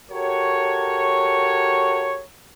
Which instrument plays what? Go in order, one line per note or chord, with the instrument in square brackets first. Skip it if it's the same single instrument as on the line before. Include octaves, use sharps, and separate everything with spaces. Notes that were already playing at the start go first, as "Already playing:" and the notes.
[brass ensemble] F#4 G4 A4 A#4 C#5